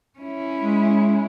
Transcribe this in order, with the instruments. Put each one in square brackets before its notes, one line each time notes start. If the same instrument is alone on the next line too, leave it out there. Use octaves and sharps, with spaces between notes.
[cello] C#4 E4
[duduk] G#3